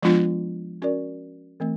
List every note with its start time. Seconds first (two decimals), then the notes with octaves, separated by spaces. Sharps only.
0.03 F3 G#3 B3 D4 F4
0.82 C#4 F#4 A#4 D5
1.60 E3 A3 C4